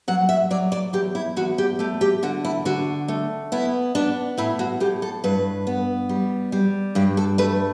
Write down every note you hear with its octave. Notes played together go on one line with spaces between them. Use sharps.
F#3 F#5
E5
F#3 D5
D5
E2 G4
E4
E2 F#4
G4
A3 G4
G4
D3 F#4
E4
D3 F#4
A3
B3 E4
B3 D4
A2 E4
F#4
A2 G4
A4
G2 B4
B3
G3
G3
G2 G4
A4
A3 B4